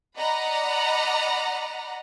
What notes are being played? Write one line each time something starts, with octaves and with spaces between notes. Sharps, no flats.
D5 D#5 F#5 A#5 B5